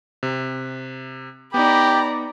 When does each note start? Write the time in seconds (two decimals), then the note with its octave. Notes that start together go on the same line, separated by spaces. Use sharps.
0.23 C3
1.54 B3 D#4 G4 D5 A#5 B5